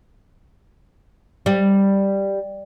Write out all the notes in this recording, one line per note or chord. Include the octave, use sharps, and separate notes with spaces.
G3